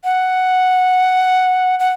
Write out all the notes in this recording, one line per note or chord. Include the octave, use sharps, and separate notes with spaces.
F#5
F#5